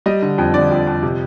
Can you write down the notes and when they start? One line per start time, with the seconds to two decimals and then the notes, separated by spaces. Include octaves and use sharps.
0.06 G3 D#5
0.22 D3
0.38 F2
0.54 D3 D5
0.71 F2
0.87 F2
1.03 C3